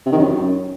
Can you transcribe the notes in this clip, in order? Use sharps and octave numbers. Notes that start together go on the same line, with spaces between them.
C3
D#3
F#2